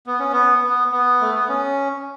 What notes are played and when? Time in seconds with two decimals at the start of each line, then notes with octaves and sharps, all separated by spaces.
0.06 B3
0.19 C#4
0.32 B3
0.64 B3
0.92 B3
1.21 A3
1.34 B3
1.49 C#4